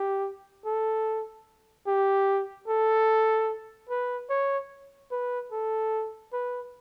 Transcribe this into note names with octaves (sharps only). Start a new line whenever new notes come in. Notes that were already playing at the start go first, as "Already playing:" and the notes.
Already playing: G4
A4
G4
A4
B4
C#5
B4
A4
B4